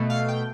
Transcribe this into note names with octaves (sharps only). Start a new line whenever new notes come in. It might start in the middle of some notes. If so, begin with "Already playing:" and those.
Already playing: B2 A3
F5
G5